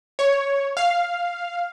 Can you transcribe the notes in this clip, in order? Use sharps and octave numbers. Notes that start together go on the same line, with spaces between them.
C#5
F5